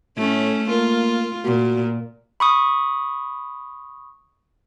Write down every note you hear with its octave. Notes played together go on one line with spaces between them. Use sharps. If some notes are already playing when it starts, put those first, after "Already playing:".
A2 A3 C#4
A#3 F4
A#2 F#4
B5 C#6 D#6